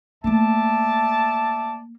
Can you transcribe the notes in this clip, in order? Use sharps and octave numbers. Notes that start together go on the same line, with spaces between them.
A3 A#3 D5 E5 A5